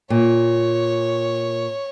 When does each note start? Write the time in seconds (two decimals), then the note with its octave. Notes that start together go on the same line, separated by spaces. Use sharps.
0.10 A#2 C#5